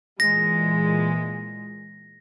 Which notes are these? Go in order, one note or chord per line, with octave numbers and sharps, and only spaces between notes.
A#2 E3 G#3 A#6